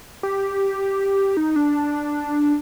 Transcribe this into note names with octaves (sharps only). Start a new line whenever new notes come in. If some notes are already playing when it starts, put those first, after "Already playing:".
G4
D#4
D4